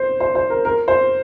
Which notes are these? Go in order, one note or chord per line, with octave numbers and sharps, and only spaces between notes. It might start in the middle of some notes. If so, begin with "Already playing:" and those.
Already playing: C5
C5
C5
A#4
A#4
C5